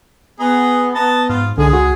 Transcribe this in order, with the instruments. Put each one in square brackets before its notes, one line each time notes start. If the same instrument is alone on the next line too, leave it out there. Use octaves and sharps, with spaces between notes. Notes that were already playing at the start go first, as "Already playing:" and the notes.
[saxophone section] B3 [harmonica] G#4 D#5 A#5
[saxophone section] B3 [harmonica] D#5 A5 A#5
[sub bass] G#2 [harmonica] F4
[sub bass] C2 [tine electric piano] D3 [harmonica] G#3 [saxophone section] G#4
[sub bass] C#2 [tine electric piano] F#4